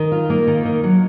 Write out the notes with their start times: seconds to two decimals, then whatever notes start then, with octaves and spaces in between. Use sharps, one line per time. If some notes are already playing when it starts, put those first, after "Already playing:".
Already playing: D#3
0.12 F4
0.30 A#3
0.47 D#3
0.65 D#3
0.84 F#3